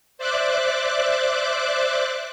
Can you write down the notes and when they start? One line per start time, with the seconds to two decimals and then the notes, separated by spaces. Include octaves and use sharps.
0.18 C5 D5 E5 D6 F#6